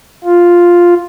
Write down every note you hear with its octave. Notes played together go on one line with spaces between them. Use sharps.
F4